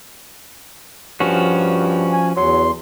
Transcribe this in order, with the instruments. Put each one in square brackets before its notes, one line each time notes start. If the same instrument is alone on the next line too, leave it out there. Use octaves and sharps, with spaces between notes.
[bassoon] G2 [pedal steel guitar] F3 C#4 F#4
[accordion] G#5
[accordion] E2 C6 [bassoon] F#3